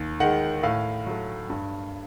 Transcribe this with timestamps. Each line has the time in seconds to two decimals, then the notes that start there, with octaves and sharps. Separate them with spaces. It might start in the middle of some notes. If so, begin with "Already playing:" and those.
Already playing: D#2
0.20 D#3 G#3 F#5
0.63 A2 F5
1.06 F#3 A3
1.50 G2